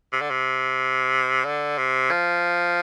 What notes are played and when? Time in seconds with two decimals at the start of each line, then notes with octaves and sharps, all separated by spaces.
0.13 C3
0.21 D3
0.30 C3
1.45 D3
1.78 C3
2.11 F3